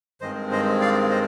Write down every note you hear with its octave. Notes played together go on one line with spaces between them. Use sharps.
G2 D#3 G#3 C4 C5 D#5
C5 D#5
D5 F5
C5 D#5